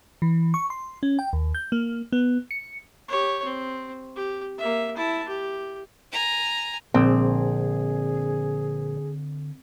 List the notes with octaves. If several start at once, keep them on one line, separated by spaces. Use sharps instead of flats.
E3
C#6
C6
C#4
G5
D#2
G6
A#3
B3
C#7
G4 C#5
C4
G4
A#3 E5
E4 A5
G4
G#5 A#5
A#1 D3 C4 G#4